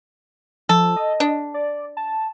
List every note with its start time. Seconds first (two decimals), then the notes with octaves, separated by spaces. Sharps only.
0.69 F3 A4
0.96 D#5
1.20 D4
1.54 D5
1.97 A5